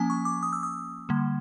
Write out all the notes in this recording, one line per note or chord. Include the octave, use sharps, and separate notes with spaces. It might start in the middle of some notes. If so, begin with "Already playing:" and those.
Already playing: F3 A#3 C#4 G#5
C#6
D6
D#6
E6
D#6
D3 G3 A#3